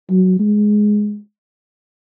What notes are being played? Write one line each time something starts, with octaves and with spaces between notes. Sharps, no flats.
F#3
G#3